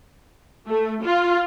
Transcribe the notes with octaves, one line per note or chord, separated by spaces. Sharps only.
A3
F4